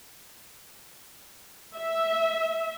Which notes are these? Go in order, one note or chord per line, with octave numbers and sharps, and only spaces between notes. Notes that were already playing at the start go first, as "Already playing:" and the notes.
E5